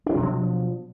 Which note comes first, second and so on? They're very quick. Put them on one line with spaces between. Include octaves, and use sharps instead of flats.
D4 F#3 B2 F3